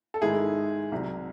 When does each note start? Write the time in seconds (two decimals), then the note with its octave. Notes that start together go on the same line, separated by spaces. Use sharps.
0.14 A4
0.21 G#2 D#3 G#3 E4 G#4
0.92 C2 C3 F#3